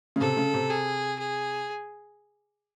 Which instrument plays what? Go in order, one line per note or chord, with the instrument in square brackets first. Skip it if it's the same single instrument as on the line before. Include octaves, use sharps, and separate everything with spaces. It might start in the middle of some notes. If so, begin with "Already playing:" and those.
[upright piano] C#3
[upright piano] C3 [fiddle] A4
[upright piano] C#3
C3
[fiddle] G#4
G#4